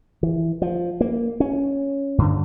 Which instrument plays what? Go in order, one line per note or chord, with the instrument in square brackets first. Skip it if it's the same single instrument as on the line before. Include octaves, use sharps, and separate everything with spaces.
[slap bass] E3
F3
A#3
C#4
G2 D3